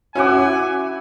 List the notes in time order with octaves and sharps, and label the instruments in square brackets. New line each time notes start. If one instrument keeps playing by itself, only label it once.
[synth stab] C#4 [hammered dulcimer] E4 E5 F#5 [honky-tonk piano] F#4 D6 [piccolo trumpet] G#5